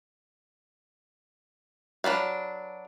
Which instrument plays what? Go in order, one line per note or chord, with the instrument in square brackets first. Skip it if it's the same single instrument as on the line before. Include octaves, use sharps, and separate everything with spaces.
[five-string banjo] F#3 D4 B4 F5